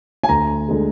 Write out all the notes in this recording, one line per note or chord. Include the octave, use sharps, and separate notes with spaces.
G#5
D2 A#5
D3 G#3